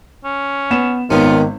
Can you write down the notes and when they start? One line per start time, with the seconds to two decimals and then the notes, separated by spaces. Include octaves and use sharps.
0.24 C#4
0.71 B3 E7
1.10 G#1 D#3 B3 C#4 F4